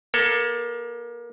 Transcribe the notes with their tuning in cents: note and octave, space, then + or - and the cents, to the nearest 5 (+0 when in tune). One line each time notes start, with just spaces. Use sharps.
A#3 +30 A4 +15